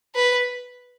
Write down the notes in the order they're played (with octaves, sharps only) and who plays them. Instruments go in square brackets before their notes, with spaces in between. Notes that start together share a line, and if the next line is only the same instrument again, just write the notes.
[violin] B4